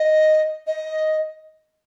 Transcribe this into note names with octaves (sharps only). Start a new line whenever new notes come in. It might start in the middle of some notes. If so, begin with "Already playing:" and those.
Already playing: D#5
D#5